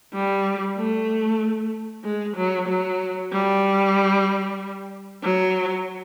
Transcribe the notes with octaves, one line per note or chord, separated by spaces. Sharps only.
G3
A3
G#3
F#3
F#3
G3
F#3